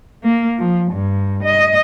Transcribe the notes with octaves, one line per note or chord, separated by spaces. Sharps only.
A#3
F3
G2
D#5